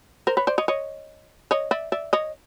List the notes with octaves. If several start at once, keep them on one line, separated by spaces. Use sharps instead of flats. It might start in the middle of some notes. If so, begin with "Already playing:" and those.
A#4 C5
B4 C#5
C5 D5
C#5 D#5
C#5 D#5
C#5 D#5
D5 E5
D5 E5
C#5 D#5